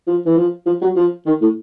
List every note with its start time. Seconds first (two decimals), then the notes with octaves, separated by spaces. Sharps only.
0.07 F3
0.25 E3
0.37 F3
0.66 F3
0.81 F#3
0.96 F3
1.26 D#3
1.41 A2